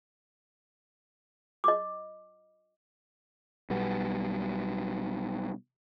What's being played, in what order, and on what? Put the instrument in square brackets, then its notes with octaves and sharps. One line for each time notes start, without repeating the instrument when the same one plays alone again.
[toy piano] D#5 D6
[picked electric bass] B1 B2 G3 B3